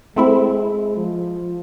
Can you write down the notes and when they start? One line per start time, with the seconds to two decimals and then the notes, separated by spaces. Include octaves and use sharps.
0.16 G#3 A3 C4 E4
0.97 F3